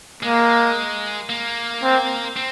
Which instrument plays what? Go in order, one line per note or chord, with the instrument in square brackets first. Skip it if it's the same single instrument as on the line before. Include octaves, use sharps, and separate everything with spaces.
[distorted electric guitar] G#3 [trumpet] A#3
[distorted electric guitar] A#3
[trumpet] C4
[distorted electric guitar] C4